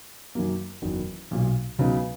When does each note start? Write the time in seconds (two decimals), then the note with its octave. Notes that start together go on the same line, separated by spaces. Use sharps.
0.35 F#2 D#3 F#3 A#3
0.82 F#1 E2 D#3 F#3
1.31 B1 A#2 F#3
1.79 C#2 C#3 F#3 B3 D#4